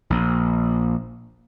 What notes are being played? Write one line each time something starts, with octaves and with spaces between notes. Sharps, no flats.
A#1